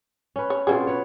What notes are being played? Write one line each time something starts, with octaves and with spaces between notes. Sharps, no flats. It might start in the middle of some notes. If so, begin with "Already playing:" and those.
C#4 B4
C#5
B2 C4 C#4 F4 G#4
B4 C#5